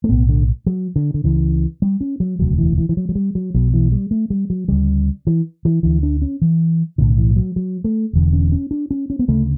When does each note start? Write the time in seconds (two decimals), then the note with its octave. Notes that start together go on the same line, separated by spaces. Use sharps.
0.04 A3
0.09 B1 A2 B3
0.29 D3
0.66 F#3
0.96 D3
1.14 D3
1.24 C#2 C#3 E3
1.82 G3
2.01 C#4
2.20 F#3
2.39 E1 D2 C#3 F#3
2.58 E3
2.78 E3
2.89 E3
2.97 F#3
3.09 F#3
3.15 G3
3.35 F#3
3.54 B1 B2 F#3
3.74 E3
3.92 G3
4.11 A3
4.30 G3
4.50 F#3
4.68 D2 C#3 G3
5.27 E3
5.65 E3
5.83 D2 D3 E3
6.03 D4
6.22 C#4
6.42 E3
6.98 B1 A2 D3
7.18 E3
7.36 F#3
7.56 F#3
7.84 A3
8.13 E1 E2 D3
8.33 C#4
8.52 C#4
8.71 D4
8.91 C#4
9.10 C#4
9.19 B3
9.28 D2 C#3 A3